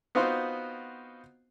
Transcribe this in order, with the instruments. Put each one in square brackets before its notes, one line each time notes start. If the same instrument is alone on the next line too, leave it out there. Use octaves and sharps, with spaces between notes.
[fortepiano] B3 C4 D#4 F4 F#4 C5